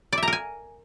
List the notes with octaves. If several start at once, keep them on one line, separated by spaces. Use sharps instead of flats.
D5
E5
A#5
A#4
G#5